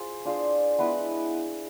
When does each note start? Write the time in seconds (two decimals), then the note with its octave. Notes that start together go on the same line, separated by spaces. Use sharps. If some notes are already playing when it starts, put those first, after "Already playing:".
Already playing: F4 G#4 C5
0.25 D4 F4 G#4 C5
0.78 G#3 B3 E4 B4